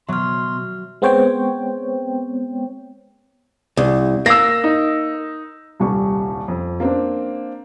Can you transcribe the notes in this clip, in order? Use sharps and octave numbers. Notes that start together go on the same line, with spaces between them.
B2 F#3 E5 C6 F6
G#3 B3 C4 C5 C#5 G5
C2
A#3 E6 A#6
D#4
D#1 C2 G3 C#6
F2
A#3 C4 D4